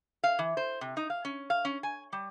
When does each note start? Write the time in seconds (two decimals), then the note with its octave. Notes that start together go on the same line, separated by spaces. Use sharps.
0.24 F5
0.39 E3
0.57 C5
0.81 C3
0.97 D#4
1.10 F5
1.25 C#4
1.50 F5
1.65 C#4
1.83 G#5
2.13 G3